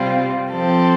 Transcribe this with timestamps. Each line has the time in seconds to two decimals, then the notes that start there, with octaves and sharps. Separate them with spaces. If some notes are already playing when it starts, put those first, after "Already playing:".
Already playing: C3 G3 C4 F4
0.49 F3 C4 A4